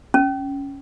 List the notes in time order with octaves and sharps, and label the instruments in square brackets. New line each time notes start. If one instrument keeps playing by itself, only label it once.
[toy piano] C#4